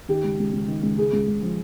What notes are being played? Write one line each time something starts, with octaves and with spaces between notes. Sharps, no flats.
D#3 G4
C#2
C#2
C#2
D#3
C#2
C#2 G#4
C#2
C#2
F3